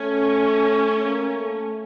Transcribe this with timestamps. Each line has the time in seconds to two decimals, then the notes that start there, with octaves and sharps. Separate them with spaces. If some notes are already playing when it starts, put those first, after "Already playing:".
Already playing: A3 C#4
1.04 A#3
1.38 A3